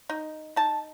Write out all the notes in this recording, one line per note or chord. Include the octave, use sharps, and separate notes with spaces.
D#4
D#4 A5